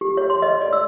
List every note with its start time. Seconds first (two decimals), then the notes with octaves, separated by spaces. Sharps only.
0.01 G4
0.17 C#5
0.30 C6
0.42 D#5
0.61 D5
0.73 E6